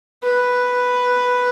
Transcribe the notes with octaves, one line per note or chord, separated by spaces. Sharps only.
B4